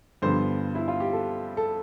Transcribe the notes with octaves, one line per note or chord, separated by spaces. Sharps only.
G2 D3 F3 B3 C5
E4
F4
G4
A4
A4